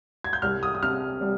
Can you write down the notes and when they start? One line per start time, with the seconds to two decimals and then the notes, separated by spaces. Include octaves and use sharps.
0.24 G#6
0.33 G6
0.42 C2 F6
0.63 D#6
0.75 D#6
0.83 C3 F6
1.21 G3